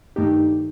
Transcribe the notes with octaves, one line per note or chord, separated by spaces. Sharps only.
G2 D#3 A3 D#4 G4